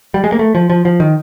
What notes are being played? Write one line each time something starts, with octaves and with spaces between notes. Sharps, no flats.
G3
G#3
A#3
A3
F3
F3
F3
D#3